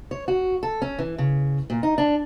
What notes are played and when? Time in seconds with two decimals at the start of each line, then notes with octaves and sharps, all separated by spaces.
0.11 C#5
0.28 F#4
0.63 A4
0.82 C#4
0.99 E3
1.18 C#3
1.70 A#2
1.83 D#4
1.98 D4